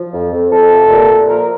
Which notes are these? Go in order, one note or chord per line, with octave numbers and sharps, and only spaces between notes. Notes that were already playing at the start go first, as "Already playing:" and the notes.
Already playing: F3
F2
F2
F2 A4
C3
A#2
A#2
F3 A#4